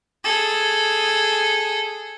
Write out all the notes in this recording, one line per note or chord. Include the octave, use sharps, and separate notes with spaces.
G#4 A4